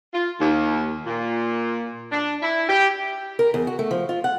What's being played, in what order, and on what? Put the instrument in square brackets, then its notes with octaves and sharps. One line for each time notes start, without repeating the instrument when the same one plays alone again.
[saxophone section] F4
D#2
A#2
D4
E4
G4
[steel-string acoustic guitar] A#4
E2
F#4
A3
F3
F4
F#5